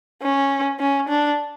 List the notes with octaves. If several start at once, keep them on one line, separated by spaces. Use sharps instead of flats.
C#4
C#4
D4